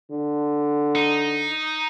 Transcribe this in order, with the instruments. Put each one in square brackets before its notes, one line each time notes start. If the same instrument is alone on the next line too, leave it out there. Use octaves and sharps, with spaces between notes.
[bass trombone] D3
[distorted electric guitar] D#4